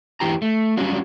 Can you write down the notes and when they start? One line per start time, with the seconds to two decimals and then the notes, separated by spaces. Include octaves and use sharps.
0.20 E2 E3 G4 A#5
0.42 A3
0.77 F#3 G3 C#4 F4 F#4